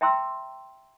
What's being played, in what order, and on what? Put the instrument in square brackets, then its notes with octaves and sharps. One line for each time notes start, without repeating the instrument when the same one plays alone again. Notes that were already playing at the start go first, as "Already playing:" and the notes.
[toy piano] E5 G5 A#5 C6 E6